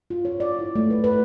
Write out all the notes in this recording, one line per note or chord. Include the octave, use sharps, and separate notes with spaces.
F4
C#5
D5
E4
A3
B4
B4